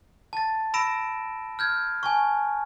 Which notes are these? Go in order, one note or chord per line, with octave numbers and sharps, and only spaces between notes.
A5 A6
B5 E6 A#6 D7 E7
F6 G6 G#6
G#5 A5 C#6